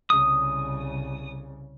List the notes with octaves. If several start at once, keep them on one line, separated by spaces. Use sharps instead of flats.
C2 C#3 D#6